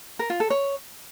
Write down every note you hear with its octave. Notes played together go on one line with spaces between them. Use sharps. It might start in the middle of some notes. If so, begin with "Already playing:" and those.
A#4
F4
A4
C#5